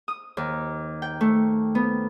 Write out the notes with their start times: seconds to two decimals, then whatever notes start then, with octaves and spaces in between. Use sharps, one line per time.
0.08 D#6
0.37 D#2
1.02 G5
1.21 A3
1.75 B3